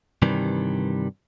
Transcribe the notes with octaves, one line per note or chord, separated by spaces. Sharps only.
G2 C3 D#3 E3 G3